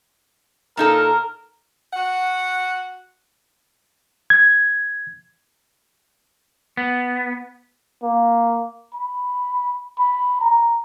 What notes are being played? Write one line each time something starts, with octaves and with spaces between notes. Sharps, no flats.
A#2 D#4 A4 A#4
F#4 F#5
G#6
B3
A#3
B5
B5
A#5